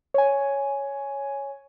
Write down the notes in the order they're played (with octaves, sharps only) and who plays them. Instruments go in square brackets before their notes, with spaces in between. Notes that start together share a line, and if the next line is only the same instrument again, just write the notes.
[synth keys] C#5 G#5